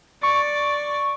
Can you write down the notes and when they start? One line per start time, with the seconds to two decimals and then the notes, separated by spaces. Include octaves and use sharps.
0.23 D5 C#6